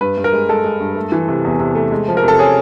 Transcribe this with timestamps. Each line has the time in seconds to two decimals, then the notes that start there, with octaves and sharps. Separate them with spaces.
0.01 G2 B4
0.18 G2
0.24 A#4
0.33 G#3
0.49 G#3 A4
0.64 G#3
0.80 G2
0.96 A3
1.12 E3
1.28 C3
1.45 E2
1.60 C3
1.75 A3
1.92 G#3
2.08 F3
2.17 A#4
2.23 C3 A4
2.39 C#4 G#4